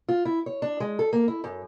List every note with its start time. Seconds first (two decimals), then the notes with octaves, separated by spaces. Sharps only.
0.08 F4
0.25 E4
0.46 C#5
0.62 D4
0.80 G#3
0.99 A4
1.13 A#3
1.28 E4
1.44 F#2